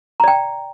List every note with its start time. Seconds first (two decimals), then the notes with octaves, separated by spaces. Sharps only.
0.20 A#5
0.24 D5
0.28 G5